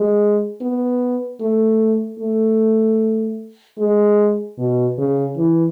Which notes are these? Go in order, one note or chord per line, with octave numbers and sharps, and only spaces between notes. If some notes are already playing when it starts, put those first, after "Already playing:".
Already playing: G#3
B3
A3
A3
G#3
B2
C#3
E3